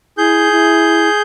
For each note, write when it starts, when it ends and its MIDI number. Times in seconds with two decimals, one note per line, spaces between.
0.18 0.51 64
0.18 1.22 68
0.18 1.22 91
0.52 1.09 64